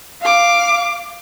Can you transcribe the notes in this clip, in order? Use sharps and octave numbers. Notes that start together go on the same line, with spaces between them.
F5 D6